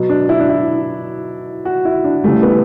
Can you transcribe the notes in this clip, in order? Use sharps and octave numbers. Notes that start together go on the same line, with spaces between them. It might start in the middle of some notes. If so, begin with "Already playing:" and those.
Already playing: B2 F#3
D4
E4
D4
E4
F#4
E4
D4
C#3 E3 G3 A3
B3